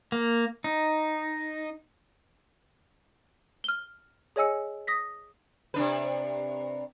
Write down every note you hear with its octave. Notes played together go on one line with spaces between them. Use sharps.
A#3
D#4
F6 G7
G#4 C#5 D#5 G#5 E6 C#7
D#6 A#6 B6
C3 D4 B4